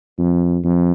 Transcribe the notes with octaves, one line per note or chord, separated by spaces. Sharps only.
F2
F2